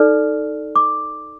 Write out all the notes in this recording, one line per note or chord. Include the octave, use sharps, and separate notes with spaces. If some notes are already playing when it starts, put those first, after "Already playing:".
Already playing: D#4 A4 D5 F6
D6